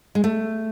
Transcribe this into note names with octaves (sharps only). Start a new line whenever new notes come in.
G#3
A3